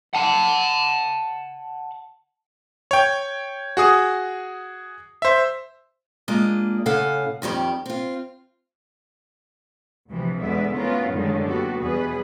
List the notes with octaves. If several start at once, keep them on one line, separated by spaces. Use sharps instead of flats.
F#5 A5
C#5 G5
F#4 G#4 D#6
C5 E5
G#3 A#3 D4 F4 D#5
A2 C#3 A4 F5 F#5 G#5
F2 D#3 G3 G4
C4 F4
D2 C3 E3 F3
E2 B2 D3 G#3 B3 E5
A3 B3 C#4 E4 F4 A#4
F#2 A2 D3 D#3 G3 G#3
F#2 A#3 B3 F#4 G4 A4
E2 B2 G3 G#4 B4